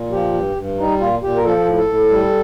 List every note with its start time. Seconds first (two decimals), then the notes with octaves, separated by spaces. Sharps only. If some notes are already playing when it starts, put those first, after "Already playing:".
Already playing: A#2
0.11 F3 G4
0.34 G2
0.56 G2
0.77 G3 D#4
1.00 A#2 F4
1.23 A#2 G4
1.37 A#4
1.44 F3 A4
1.66 A2
1.78 A4
1.88 A2
2.10 G3